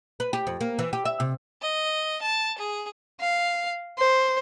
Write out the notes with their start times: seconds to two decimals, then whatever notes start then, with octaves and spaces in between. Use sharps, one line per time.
0.20 B4
0.33 G4
0.47 F2
0.61 A#3
0.79 E3
0.93 G4
1.05 E5
1.20 C3
1.62 D#5
2.22 A5
2.58 G#4
3.20 F5
3.98 C5